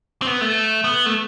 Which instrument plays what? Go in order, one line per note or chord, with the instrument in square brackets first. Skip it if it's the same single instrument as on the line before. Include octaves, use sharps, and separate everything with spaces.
[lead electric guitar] C4
B3
A3
B3
A3